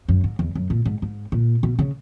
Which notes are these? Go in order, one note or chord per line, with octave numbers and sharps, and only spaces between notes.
F#2
G#2
E2
F#2
A#2
G#2
G#2
A#2
B2
C#3